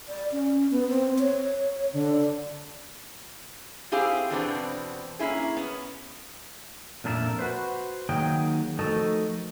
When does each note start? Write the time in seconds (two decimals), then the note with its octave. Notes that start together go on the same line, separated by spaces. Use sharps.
0.08 D5
0.32 C#4
0.71 B3
0.89 C4
1.19 C#5
1.93 D3
3.92 C4 E4 G4 G#4 C5 F5
4.30 E2 B2 B3 C4 D4
5.19 A#3 C#4 E4 G#4
5.57 B3 C#4
7.04 F2 A#2 D4 E4 A#4 E5
7.39 F#4 B4 C5
8.09 D#3 F#3 A#3 G#4 G5
8.79 F3 A3 D#4 F#4 A4 A#4